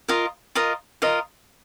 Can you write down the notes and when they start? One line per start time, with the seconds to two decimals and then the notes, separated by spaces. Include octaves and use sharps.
0.09 F4 A#4 D#5
0.55 F4 A#4 D#5
1.02 F4 A#4 D#5